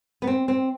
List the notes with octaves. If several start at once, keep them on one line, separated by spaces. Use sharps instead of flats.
B3
C4
C4